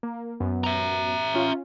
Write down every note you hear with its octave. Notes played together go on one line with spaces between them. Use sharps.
A#3
F#2 B3
E5 A#5
C#4 F4